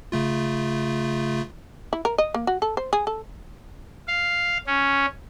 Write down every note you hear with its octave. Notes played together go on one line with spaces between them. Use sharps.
C#3 A3 F4
E4
A#4
D#5
A#3
F#4
A4
C5
G#4
A4
F5
C#4